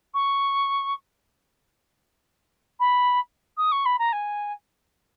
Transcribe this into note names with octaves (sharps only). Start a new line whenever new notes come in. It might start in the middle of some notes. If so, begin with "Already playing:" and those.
C#6
B5
D#6
C#6
B5
A#5
G#5